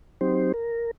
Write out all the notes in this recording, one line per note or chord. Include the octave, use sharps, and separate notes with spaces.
F#3 C4 D#4 G4 C5
A#4